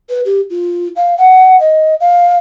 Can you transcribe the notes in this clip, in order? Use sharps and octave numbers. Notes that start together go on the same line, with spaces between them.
B4
G4
F4
F5
F#5
D#5
F5